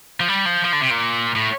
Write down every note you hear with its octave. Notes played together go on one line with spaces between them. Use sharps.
F3
G3
F3
F3
D3
C3
A#2
A2